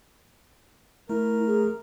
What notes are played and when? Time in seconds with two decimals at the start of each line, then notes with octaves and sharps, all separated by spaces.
1.09 A3 E4 A#4
1.47 G#4